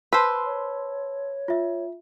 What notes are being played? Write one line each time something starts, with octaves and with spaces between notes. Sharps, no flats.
B4 C5 A5 C6 E6
C#5
F4 E5